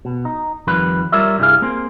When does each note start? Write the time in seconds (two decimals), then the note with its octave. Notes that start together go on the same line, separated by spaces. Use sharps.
0.05 B2
0.25 D#4
0.67 F2 D#3 F3 G3 B4
1.12 G3 F4 A#4 C#5 D5 E5
1.38 C2 G2 G3 E4 G#4 F5
1.62 A#3 C4 G#4 C5